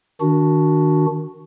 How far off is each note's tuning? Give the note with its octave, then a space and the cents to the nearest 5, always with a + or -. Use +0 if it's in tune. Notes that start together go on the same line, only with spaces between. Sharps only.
D#3 +0 D4 -10 F#4 +0